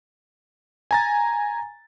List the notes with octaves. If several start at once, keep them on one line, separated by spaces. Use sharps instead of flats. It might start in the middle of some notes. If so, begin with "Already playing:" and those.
G#5 A#5 A6